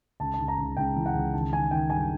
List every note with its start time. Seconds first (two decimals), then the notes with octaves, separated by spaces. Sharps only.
0.20 C#2 A5
0.34 A5
0.39 C#2
0.48 A#5
0.58 C#2
0.77 C#2 G5
0.96 E3
1.06 F#5
1.15 C#2
1.33 D#3 A5
1.53 D#3 G#5
1.71 D#3 G5
1.90 G2 G#5